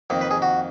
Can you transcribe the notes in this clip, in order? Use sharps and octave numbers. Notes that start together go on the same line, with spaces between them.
F2 D#3 A#3
B4
G#4
F#4